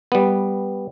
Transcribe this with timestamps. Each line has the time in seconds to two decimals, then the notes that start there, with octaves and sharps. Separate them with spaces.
0.12 G3 B3